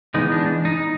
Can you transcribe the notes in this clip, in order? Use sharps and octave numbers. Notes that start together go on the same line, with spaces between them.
E3 G#3 B3 D#4
D4
D#4